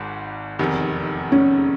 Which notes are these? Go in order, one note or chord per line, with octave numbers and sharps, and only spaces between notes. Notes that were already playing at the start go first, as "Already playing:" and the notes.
Already playing: G#1 G#2
F1 E2 C3 D#3
C#4